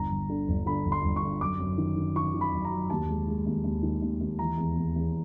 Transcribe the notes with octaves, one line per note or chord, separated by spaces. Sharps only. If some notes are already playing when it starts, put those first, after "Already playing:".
Already playing: G1 A#5
G1
D3
G1
D3 B5
G1
C6
G1
C#6
D3
F#2 D6
F#2
D#3
D#3
D#3 C#6
D#3
B5
F#2
A#5
F#3
D#2 A5
G#3
G#3
D#2
D#2
D#3
D#2
D#2
E3 A#5
E2
E2
E2